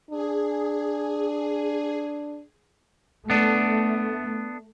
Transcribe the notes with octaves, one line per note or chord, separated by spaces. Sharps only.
D4 G#4
A3 B3 D4